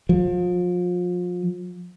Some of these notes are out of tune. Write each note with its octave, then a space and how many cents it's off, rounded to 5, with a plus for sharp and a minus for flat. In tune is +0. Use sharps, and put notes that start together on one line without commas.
F3 +30